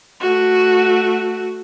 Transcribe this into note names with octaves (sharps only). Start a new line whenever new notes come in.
A3 F#4